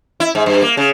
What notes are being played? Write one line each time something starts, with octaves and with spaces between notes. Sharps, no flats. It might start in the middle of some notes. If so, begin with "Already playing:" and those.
E4
G#2
G2
A#3
C#3